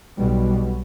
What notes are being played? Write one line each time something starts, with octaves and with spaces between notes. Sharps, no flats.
B1 B2 G3